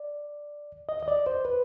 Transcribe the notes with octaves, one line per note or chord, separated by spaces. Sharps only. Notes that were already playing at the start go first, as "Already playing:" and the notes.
Already playing: D5
D#5
D#5
D5
C5
B4